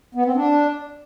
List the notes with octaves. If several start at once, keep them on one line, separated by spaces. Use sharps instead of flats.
B3
C4
D4